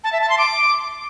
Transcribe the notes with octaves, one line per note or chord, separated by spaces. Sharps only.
A5
E5
A5
C6
D6